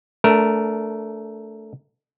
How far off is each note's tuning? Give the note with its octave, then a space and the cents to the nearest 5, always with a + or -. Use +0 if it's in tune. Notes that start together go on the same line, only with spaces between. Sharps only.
A3 +0 D4 -25 A#4 +0